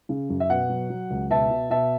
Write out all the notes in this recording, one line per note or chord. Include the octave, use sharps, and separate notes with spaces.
C#3
F#2
E5
B2 F#5
F#3
F#3
C#2
B2 E5 A5
B2
B2 E5 A5